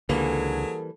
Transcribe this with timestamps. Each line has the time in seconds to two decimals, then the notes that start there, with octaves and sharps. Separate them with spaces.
0.09 C#2 D3 E3 F#3 G3 A#3 G#4 A4